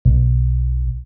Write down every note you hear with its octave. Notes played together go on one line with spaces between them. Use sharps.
B1